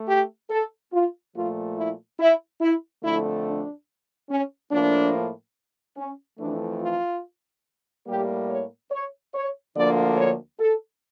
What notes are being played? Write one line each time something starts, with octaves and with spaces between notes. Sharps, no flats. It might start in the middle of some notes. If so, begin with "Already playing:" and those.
Already playing: A3
G4
A4
F4
A#2 F3 A3 F4
E4
E4
E4
F2 D3 A3 E4
D4
C#4
A2 F3 A#3 D4
C#4
F2 E3 A3 D4
F4
A2 G3 A#3 G4
C#5
C#5
C#5
D2 D3 F3 A#3 D5
C#5
A4